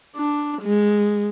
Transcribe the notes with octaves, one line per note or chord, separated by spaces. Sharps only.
D4
G#3